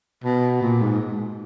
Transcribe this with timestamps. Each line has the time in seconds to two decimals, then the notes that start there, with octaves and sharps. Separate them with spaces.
0.24 B2
0.63 A#2
0.82 G#2